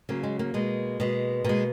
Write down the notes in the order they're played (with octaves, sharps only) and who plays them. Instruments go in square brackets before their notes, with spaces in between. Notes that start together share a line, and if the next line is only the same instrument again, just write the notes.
[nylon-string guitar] C#3 F#3 A#3
G#3
A#3
B2 G#3
B2 G#3
B2 G#3 A#3